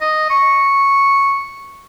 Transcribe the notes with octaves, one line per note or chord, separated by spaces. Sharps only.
D#5
C#6